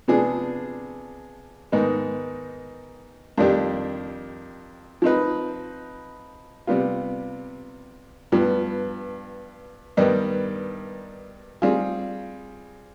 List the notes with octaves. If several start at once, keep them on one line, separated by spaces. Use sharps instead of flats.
C3 F3 B3 D4 G#4
G#2 D#3 B3 D#4
F2 D#3 G3 D4 G4
F3 C4 D#4 B4
C3 G3 B3 F4
G2 F3 B3
G2 D#3 G3 B3 D#4
G3 C4 F4 G#4